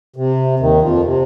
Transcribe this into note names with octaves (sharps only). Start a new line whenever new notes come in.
C3
D#2 D#3
F2 F3
C3